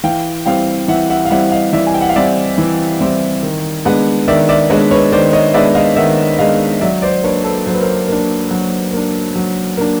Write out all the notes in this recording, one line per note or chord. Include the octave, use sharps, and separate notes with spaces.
E3 F5 G5
G3 C4 E4 F5 G5
E3 E5 F#5
E5 F#5
F5
G3 C4 E4 E5 F#5
D#5 F5
E3 D5 E5
G#5
G5
F#5
F5
G3 C4 E4 D5 E5
E3
G3 C4 E4
D#3
G#3 B3 D4
D#3 D5 E5
D5 E5
G#3 B3 D4 C#5 D#5
B4 C#5
D#3 C5 D5
C#5 D#5
G#3 B3 D4 D5 E5
D#5 F5
D#3 E5 F#5
G#3 B3 D4 D#5 F5
F#3 D5 E5
C5 D5
A#3 D4 B4 C#5
A4 B4
F#3 C5
B4
A#4 C5
A#3 D4
F#3
A#3 D4
F#3
A#3 D4